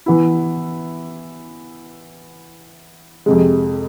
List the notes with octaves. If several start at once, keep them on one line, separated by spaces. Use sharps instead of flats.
E3 B3 E4
F2 C3 G#3